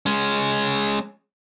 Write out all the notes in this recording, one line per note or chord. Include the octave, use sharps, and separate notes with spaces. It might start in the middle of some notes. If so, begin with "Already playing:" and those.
G#3 C#4